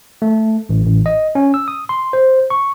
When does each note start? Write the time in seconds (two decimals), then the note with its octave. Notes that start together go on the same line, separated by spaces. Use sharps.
0.22 A3
0.69 A1
0.85 A1
1.06 D#5
1.35 C#4
1.54 E6
1.68 D#6
1.89 C6
2.13 C5
2.50 C#6